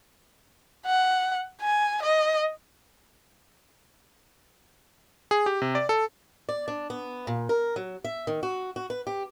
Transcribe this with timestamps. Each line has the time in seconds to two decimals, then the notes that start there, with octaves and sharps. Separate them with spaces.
0.86 F#5
1.61 G#5
2.02 D#5
5.31 G#4
5.46 G4
5.62 C3
5.75 D5
5.89 A4
6.49 D5
6.68 D4
6.90 B3
7.27 A#2
7.49 A#4
7.76 F#3
8.04 E5
8.27 D#3
8.43 F#4
8.76 F#4
8.90 B4
9.07 G4